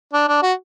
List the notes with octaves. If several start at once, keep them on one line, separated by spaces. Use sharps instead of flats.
D4
D4
F#4